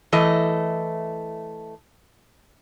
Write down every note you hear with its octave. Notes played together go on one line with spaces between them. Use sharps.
E3 A3 D#5